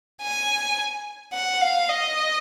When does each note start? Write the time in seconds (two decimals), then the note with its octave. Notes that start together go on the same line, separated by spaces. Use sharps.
0.22 G#5
1.34 F#5
1.61 F5
1.89 D#5